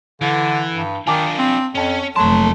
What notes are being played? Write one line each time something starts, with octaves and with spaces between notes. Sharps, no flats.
D3 E3
G2
D#3 D4 F4 G#5 A5 D6
C4
F2 C#4 A5 F7
F1 F#3 A3 A#3 A5 C6